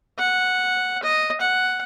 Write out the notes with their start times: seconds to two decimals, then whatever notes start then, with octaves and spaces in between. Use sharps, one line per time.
0.19 F#5
1.03 D#5
1.41 F#5